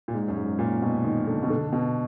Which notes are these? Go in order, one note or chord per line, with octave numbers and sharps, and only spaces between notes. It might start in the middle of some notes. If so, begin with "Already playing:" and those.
A#2
G#2
F#2
G#2
A#2
B2
D#3
D3
B2
D3
B2